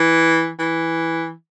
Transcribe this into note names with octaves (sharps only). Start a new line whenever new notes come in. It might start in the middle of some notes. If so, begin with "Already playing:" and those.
Already playing: E3
E3